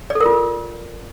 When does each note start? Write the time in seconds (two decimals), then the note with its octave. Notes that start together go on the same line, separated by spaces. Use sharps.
0.10 D5
0.15 A4
0.20 A#4
0.26 F4